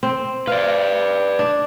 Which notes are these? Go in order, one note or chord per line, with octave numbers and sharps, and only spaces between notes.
C4
B4 D5 F5
D4